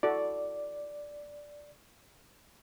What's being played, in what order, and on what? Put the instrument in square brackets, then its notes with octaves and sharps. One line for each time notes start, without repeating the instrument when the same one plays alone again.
[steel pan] E4 F#4 A4 [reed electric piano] D5